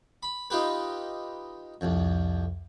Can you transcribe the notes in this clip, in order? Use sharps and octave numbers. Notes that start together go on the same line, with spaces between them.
B5
D#4 F4 G4 B4
C2 F2